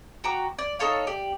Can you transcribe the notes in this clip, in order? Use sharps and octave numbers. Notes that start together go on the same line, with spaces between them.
F#4 G5 A#5 D6
D5
D#4 A4 C#5 F5
G4 D5